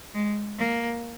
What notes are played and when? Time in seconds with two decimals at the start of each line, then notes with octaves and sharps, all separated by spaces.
0.14 G#3
0.58 A#3